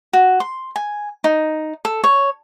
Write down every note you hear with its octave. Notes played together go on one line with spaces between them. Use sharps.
F#4
C6
G#5
D#4
A4
C#5